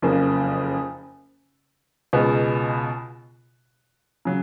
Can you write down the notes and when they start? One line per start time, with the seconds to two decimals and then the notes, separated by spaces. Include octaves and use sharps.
0.02 F#1 F2 C#3 F3 A#3
2.13 C#2 B2 G#3 B3
4.25 C#3 F#3